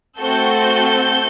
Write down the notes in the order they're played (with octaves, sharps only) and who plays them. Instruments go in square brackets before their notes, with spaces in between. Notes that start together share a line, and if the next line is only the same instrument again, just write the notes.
[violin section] A3 C4 F#4 A4 G6